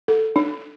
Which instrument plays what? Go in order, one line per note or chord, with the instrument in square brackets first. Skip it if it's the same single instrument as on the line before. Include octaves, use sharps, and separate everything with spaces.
[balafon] A4
D4